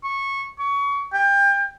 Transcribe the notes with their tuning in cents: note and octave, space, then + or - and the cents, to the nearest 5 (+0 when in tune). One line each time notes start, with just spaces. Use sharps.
C#6 -15
C#6 +25
G5 +30